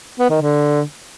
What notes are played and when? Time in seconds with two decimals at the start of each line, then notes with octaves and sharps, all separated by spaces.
0.19 B3
0.30 D#3
0.41 D3